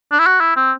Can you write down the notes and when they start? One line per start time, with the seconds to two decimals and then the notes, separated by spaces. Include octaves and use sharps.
0.12 D4
0.19 E4
0.27 F#4
0.40 E4
0.56 C4